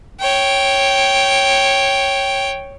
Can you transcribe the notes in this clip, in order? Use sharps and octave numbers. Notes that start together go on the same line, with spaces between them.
C#5 G5